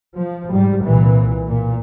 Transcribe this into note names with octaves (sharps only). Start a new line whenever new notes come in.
F3
G#2 G3
C2 A#2 E3
A#2